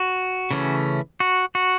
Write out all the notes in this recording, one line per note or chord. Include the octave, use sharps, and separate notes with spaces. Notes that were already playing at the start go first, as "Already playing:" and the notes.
Already playing: F#4
C#3 E3 A3 C#4
F#4
F#4